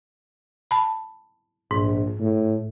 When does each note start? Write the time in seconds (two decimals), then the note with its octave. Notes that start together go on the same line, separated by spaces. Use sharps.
0.71 A5 B5
1.71 A#1 G#2
2.19 A2